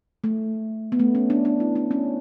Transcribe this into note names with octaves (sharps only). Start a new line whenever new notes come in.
A3
B3
A3
C#4
D4
D4
E4
D4
C#4